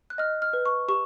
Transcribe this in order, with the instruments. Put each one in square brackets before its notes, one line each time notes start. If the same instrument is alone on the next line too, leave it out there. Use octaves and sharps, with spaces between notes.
[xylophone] F#6
D#5 F6
F6
B4
C#6
G4 C#6